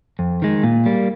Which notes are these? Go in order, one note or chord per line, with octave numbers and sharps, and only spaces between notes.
F2
D#3 G#3
A#2
G3 A#3